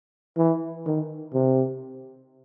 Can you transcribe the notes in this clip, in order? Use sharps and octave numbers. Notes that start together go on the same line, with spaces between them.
E3
D#3
C3